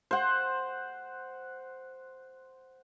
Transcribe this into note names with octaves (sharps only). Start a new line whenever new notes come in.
C5 F#5